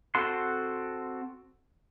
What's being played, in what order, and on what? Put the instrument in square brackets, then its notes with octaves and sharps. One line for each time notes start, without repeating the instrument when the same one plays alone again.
[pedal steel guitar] C4 F#4 A4 F#5 C6